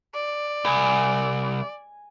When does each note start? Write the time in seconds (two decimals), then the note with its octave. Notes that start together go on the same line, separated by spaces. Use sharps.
0.14 D5
0.65 C2 G#5